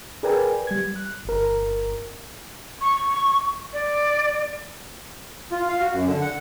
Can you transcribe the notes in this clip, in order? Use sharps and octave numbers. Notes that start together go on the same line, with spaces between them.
G#4 A#4 B4 D5 G5 G#5
G3 G#6
F#6
G1 A#4
C#6
D5
F4
F5
F#4
F#2
D3
F#5